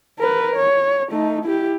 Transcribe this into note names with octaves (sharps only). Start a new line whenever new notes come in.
A#4 B4
C#5
A3 D#4
E4 G4